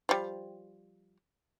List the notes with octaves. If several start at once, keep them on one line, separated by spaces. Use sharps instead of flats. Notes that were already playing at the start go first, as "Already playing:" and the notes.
F3 G3